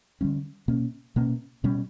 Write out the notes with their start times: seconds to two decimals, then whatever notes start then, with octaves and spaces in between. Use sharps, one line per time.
0.21 D3 G3 C#4
0.68 B2 A#3 C#4
1.16 B2 A#3 C#4
1.64 B2 G3 C#4